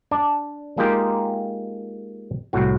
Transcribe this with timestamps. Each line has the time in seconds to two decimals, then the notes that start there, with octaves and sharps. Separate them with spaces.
0.11 D4 D5
0.77 G#3 A#3 D#4 F4 G4 A#4
2.53 C2 A2 F#4